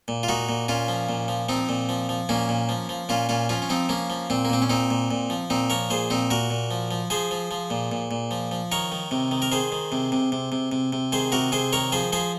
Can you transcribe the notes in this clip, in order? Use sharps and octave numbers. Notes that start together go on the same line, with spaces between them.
A#2
F4
A#2 D#4 F#4
A#2
A#2 C#4 F4
F3
A#2
F3
F3 C4 D#4
A#2
F3
F3
A#2 A#3 C#4
A#2
F3
F3
A#2 C#4 F4
A#2 C#4 F4
F3 C#4 F4
C#4
F3 C4 D#4
F3 A#3 C#4
F3
A#2 C4
A#3
A#2 C4
C#4
A#2 C4 D#4
A#2
A#2
F3
A#2 C4 D#4
F3 A#4 C#5
A#2 G#4 C5
A#2 C4 D#4
A#2 F#4 A#4
A#2
F3
F3
F3 G#4 C5
F3
F3
A#2
A#2
A#2
F3
F3
D#3 A#4 C#5
D#3
C3
D#3
A#4
D#3 G#4 C5
D#3
C3
C3
C3
C3
C3
C3
D#3 G#4 C5
C3 F#4 A#4
C3 G#4 C5
D#3 A#4 C#5
F3 G#4 C5
F3 G#4 C5